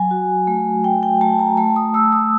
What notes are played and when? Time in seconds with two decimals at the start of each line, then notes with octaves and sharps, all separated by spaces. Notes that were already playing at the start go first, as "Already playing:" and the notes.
Already playing: F#3 G#5
0.11 F#4
0.47 A3
0.84 A3 G5
1.03 G5
1.21 A3 A5
1.39 A#5
1.57 A3 A5
1.76 D#6
1.94 A3 E6
2.13 D#6